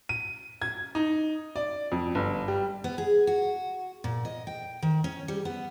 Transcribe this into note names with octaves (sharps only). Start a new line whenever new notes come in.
D#7
G#6
D#4
D5
F2
G1
G3
B3
G#4
F#4
A#2
D#5
G5
D#3
C#4
G3
B3